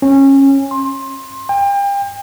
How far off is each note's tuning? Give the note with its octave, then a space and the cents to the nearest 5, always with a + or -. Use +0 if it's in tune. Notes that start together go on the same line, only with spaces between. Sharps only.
C#4 -20
C6 +20
G5 +35